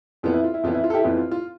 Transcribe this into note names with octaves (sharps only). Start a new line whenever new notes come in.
F2 E3 B3 F4
E4
F4
E4
F2 E3 B3 F4
E4
F4
A4
E4 G4
F2 E3 B3 F4
F4
F4